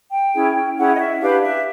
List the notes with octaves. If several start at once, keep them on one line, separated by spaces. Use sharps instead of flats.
G5
C#4 E4 G#4
C#4 E4 G#4 F#5
D#5
E5
D4 G4 B4 F5
E5